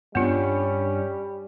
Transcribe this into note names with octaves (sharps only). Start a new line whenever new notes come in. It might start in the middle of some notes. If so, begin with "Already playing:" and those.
G2 G3 B3 C#4 D4 F4